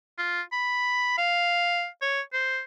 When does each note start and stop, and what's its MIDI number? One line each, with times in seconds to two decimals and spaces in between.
0.18 0.42 65
0.52 1.13 83
1.18 1.87 77
2.02 2.21 73
2.33 2.62 72